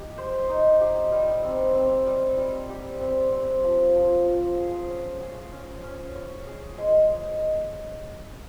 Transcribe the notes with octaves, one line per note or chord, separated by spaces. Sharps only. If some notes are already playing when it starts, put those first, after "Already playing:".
Already playing: D#4 G4
C5
D#4
G4
G3
C4
C4
G3
G3
G4
C4
C4
F3
F3
F3
G#4
C#4
G#4
C#4
C#4
C#5
G#4
G#3